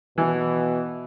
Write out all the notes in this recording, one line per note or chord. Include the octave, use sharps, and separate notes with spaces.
B2 E3